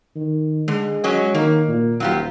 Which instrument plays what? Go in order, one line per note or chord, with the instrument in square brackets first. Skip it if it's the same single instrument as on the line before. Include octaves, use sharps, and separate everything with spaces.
[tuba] D#3
[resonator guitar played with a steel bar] D3 [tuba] G#3
[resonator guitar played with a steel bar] F#3 C#4 D#5
[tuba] D#3 [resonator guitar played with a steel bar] A#3
[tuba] A#2
[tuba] D#1 [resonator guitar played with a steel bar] F#3 F4 G4